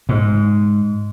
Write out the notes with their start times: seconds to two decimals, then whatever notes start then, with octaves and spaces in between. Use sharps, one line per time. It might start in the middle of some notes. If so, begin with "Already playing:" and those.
0.09 G#2